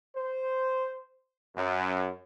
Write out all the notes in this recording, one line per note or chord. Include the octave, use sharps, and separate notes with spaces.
C5
F#2